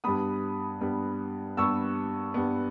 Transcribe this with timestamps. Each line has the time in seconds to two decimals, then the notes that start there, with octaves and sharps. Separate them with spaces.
0.04 G2 G3 B3 B5 D#6
0.81 G2 G3 B3
1.57 G2 G3 B3 C#6 E6
2.34 G2 G3 B3